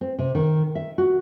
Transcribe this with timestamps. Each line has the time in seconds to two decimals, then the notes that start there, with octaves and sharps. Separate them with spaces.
0.01 C4
0.19 C3
0.35 D#3
0.75 E5
0.98 F#4